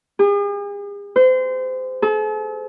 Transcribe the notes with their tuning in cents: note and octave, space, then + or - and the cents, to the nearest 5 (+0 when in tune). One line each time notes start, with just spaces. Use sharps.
G#4 -45
C5 -30
A4 -45